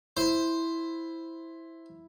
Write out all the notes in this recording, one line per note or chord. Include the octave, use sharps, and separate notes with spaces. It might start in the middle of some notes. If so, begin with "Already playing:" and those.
E4 C5